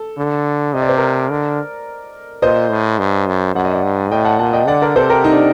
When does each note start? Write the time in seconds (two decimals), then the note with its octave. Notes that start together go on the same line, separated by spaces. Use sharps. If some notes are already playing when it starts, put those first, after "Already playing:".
Already playing: A4
0.17 D3
0.74 C3 D#5
0.82 D5
0.89 C5
0.97 A#4 D5
1.31 D3
2.42 A#2 C5 D#5
2.70 A2
2.99 G2
3.27 F#2
3.55 F#2 F#5
3.64 D#5
3.74 D5 F#5
3.83 G2
4.11 A2 D#5 G5
4.25 F#5 A5
4.39 A#2 F#5 A5
4.53 D#5 G5
4.67 D3 D5 F#5
4.82 A#4 D5
4.96 C3 A4 C5
5.10 G4 A#4
5.24 D#4
5.32 D4